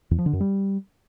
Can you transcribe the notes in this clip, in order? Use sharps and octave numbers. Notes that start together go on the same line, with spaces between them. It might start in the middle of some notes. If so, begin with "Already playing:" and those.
E2
F3
D3
F#2
G3